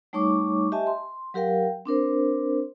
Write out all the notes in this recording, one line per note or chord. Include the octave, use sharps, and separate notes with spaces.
G3 A3 D#4 C#5 C#6 D6
G4 D#5 E5 G#5 A5
C6
F#3 G4 A#4 F5 G5
C4 D4 A#4 C5